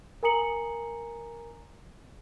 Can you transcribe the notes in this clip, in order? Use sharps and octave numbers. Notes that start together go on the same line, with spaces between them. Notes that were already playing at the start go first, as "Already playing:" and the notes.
A#4 G#5 A#5 D#6 C#7 F#7